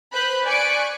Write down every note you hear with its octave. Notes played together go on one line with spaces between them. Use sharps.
B4 C5 B5 F#6 G6
D5 G#5 C#6 F#6 B6 D7